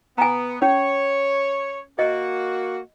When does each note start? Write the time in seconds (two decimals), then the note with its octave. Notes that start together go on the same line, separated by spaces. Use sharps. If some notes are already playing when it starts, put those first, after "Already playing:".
0.18 B3 G#5 A#5
0.62 C#4 C#5
1.99 A#3 F#4 D#5